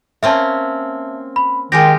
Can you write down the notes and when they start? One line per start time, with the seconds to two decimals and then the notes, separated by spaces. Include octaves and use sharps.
0.23 A#3 C4 C#4 E5 A5
1.36 B5
1.72 D#3 G#3 F4 G4 G#5 A#6